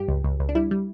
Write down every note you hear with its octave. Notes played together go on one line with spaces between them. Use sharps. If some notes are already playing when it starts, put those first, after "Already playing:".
Already playing: G2 G4
C#2
C#2
C#2
D4
G3 E4
G3